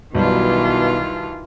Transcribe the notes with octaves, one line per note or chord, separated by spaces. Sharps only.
B1 B2 D#3 E3 G3 F4